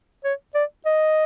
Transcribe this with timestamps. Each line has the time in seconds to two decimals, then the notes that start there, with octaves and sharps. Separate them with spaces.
0.24 C#5
0.55 D5
0.85 D#5